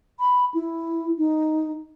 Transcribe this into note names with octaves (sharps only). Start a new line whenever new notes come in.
B5
E4
D#4